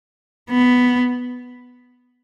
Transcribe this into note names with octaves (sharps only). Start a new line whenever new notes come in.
B3